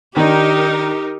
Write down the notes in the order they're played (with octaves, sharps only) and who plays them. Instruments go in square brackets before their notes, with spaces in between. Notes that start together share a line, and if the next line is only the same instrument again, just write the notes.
[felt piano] D#3 D4 [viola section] D#4 A#4 [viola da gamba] G4